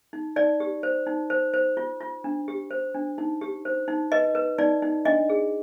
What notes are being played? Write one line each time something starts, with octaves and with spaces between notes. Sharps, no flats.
D#4
D#4 D5
G4
C5
D#4
C5
C5
F4
F4
D4
G4
C5
D4
D#4
G4
C5
D#4
B4 D#5
B4
D#4 D5
D#4
D4 D#5
G#4